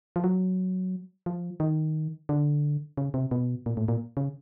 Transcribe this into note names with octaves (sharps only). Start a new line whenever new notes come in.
F3
F#3
F3
D#3
D3
C#3
C3
B2
A#2
A2
A#2
C#3